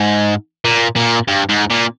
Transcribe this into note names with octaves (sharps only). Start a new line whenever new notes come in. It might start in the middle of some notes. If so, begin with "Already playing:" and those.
Already playing: G#2
A#2
A#2
G2
G#2
A#2